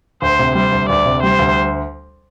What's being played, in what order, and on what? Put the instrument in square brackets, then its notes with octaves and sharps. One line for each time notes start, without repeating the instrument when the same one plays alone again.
[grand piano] D2 [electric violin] C5
[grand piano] C3
[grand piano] G3 [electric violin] C5
[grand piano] D2
[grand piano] D2 [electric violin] D5
[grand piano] C3
[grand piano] G3 [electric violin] C5
[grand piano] D2